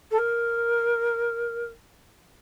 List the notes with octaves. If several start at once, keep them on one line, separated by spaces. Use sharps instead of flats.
A4
A#4